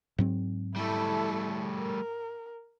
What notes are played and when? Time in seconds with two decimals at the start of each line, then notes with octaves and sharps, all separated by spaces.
0.18 G#2 F#3 C4
0.76 G3 A3 E4 A4
1.79 A#4